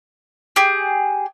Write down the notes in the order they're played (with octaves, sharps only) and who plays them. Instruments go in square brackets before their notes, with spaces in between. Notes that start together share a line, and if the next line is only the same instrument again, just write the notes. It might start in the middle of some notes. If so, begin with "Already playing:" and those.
[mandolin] G4 G#4